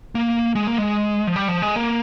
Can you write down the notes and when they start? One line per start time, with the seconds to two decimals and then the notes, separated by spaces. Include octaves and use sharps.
0.15 A#3
0.55 G#3
0.67 A#3
0.78 G#3
1.27 F3
1.36 G3
1.48 F3
1.62 G#3
1.76 A#3